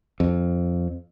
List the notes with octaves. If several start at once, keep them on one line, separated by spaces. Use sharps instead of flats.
F2